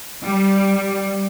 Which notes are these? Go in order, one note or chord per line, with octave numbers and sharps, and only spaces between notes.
G3